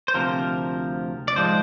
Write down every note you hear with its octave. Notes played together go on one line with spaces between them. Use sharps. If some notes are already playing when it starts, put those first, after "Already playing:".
C5
D2 C3 F3 A#4
D5
G#2 F3 G#3 C5